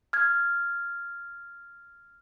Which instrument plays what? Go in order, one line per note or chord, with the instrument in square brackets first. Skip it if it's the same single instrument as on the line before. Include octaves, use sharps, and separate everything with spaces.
[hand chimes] F6 G#6